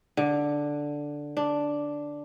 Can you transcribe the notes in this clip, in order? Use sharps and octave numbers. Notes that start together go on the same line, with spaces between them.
D3
D4